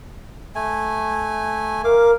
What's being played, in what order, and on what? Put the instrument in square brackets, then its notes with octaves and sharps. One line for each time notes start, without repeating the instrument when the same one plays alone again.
[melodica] A3 G#5
[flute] A#4 [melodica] F5 D6